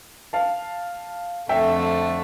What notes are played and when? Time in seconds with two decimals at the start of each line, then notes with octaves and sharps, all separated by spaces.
0.33 F5 A5
1.49 F2 D3 A3 E5 G5